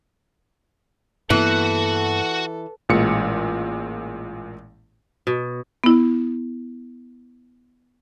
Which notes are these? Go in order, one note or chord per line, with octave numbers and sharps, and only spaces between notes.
G2 E3 A#3 B3 F#4 A4 F#5
A1 A#2 G#3 C#7
B2
B3 E4